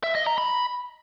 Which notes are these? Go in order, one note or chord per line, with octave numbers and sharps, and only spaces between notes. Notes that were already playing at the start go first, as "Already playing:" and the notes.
E5
D#5
A#5
B5